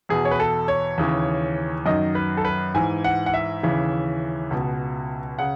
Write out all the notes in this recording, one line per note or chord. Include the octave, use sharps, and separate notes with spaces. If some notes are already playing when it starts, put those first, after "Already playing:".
E2 B2 G#4
C#5
B4
A4
C#5
D#2 C#3 E3
F#2 D#3 D#5
B4
A4
B4
G#2 E3 G#5
F#5
F#5
E5
D#2 C#3 E3
C#2 B2
C#3 F#5